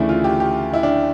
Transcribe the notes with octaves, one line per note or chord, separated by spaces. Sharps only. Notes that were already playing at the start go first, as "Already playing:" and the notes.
Already playing: D2 C#3 E3 A3 D4 E4
F4
G4
G4
E4
D4